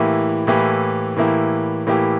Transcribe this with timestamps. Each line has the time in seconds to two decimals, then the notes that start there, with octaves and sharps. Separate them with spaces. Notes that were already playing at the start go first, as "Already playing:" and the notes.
Already playing: A2 E3 A#3 E4 G4
0.47 A2 E3 A#3 E4 G4
1.16 A2 E3 A#3 E4 G4
1.87 A2 E3 A#3 E4 G4